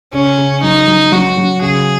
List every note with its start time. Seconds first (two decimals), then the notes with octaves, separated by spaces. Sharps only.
0.13 C#3 C#4
0.38 C#3
0.62 F#3 D#4
0.87 F#3
1.12 F#3 F#4
1.37 F#3
1.62 C#3 G#4